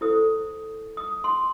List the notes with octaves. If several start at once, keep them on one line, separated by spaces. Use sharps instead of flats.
E4 A4 C5 D#6
D#6
C6